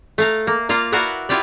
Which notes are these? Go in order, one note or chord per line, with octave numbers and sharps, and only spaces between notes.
A3 F5 A#5
A#3
A#3 F4 D5 F5 A#5
E4 F#4 A#4 B4 D5 F5
E4 F4 G4 D5